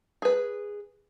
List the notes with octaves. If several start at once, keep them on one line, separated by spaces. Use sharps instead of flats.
G#4 B4